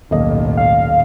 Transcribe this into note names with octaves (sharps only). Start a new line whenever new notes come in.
D#1 B1 A2 A#3 D#5
F5